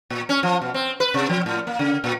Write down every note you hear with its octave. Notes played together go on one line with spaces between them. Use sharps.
A#2
C#4
F3
B2
C4
B4
C3
F3
A2
A#3
C#3
A#2